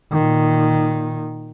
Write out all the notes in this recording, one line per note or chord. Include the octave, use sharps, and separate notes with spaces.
A#2 D#3